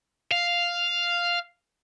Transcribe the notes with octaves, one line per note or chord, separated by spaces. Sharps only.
F5